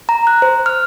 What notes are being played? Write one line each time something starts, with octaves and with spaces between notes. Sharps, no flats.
A#5
F#6
C5
F6